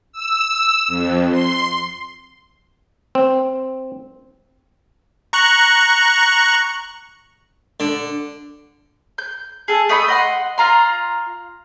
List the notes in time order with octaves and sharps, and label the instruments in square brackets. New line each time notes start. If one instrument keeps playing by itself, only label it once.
[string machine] E6
F2
C6
[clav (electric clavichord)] C4
[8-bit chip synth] A#5 C#6 F#6
[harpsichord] D3
[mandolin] G6
G#4 A4
A3 D#5 A5 B5
D#5 F#5 C6
F4 A#5 C6